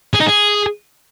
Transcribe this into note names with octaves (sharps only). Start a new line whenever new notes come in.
G#4
D#4
G#4